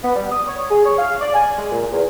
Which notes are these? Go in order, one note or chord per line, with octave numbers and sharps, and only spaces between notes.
B3
G3
D#6
C#5
G#4
C#5
F5
D5
G#5
G#3
A#2
E2